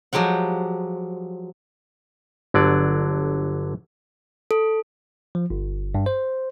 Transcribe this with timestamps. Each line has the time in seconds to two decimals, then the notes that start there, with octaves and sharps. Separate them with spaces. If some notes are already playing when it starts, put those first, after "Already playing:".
0.13 F3 F#3 G#3 G4 F#5
2.54 G1 D3 F#3 D5
4.51 A4
5.35 F3
5.50 G1
5.95 G2
6.06 C5